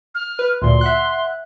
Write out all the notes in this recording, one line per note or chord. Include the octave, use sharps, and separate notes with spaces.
F6
B4
D2 A#2 C6
E5 F#5 F#6